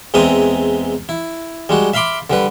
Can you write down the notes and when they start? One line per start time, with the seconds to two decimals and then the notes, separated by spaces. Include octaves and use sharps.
0.14 E2 G#3 C4 E5 A#5 D#6
1.09 E4
1.69 G3 G#3 F#4
1.94 E5 F5 B5 C6 D6
2.30 D3 G3 B4